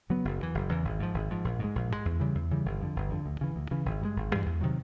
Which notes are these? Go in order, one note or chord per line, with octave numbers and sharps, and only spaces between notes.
C#3 F#3 B3
F#1
E2 C#3 E3
F#1
E2 C#3 E3
G#1
G#2 F3
G#1
G#2 F3
A#1
G#2 D#3 G#3
A#1
G#2 D#3 G#3
E2
C#3 E3 G3
E2
C#3 E3 G3
G1
F2 D3
G1
F2 D3
D2
C#3 E3
D2
C#3 E3
G#1
G2 E3 G#3
G#1
G2 E3 G#3
E2
C3 D#3 F#3